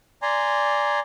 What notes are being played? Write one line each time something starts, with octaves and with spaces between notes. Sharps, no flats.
D5 G#5 A#5 C6